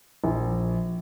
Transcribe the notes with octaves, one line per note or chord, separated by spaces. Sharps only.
A#1